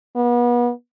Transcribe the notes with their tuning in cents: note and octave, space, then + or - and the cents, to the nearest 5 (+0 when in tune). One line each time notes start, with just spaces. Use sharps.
B3 -35